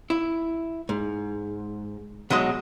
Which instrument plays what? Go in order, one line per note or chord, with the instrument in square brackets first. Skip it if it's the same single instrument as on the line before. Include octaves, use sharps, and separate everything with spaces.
[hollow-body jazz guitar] E4
G#2
[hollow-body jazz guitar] B2 D#5 C6 [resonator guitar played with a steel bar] F#3 G#3